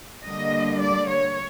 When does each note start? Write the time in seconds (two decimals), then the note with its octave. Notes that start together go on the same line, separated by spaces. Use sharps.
0.25 D3 G3 A#3 D4 D#5
0.82 D5
1.10 C#5